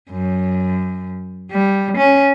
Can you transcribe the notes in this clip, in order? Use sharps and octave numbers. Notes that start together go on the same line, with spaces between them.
F#2
G3
C#4